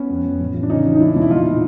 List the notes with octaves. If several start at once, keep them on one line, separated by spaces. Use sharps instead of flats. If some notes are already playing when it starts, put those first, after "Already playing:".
Already playing: B3 C#4
F2
F2
A1
A1
D4
C#3 C#4 D#4
E3
D#4
E2 D4 E4
B2
E4
A#1 D#4 F4
A#2